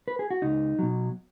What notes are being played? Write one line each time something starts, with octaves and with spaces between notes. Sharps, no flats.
B4
G#4
F#4
C#2 D#4
B2 F#3